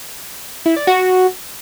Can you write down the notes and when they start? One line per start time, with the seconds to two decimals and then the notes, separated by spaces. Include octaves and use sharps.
0.66 E4
0.76 D5
0.87 F#4